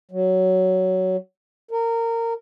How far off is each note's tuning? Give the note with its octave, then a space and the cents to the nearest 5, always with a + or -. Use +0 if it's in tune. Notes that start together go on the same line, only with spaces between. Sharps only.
F#3 +10
A#4 -20